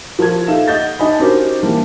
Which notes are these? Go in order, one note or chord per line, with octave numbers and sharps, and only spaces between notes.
F3 A#4 A5 G#6
D#4 A4 E5 F5 E7
D#5 F#5 G6 A6
D4 D#4 D#5 G#5 B5
C#4 D#4 F#4 G4 A#4 C5
E3 G3 A#3 D4